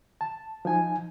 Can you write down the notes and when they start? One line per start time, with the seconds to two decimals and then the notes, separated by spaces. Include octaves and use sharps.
0.21 A5
0.65 F3 D#4 G#5